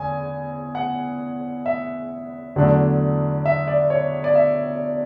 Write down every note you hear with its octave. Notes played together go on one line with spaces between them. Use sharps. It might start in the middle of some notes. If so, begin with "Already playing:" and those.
Already playing: E2 D3 G#5
F#5
E5
E2 D3 F#3 A3 D4
E5
D5
C#5
D5
E5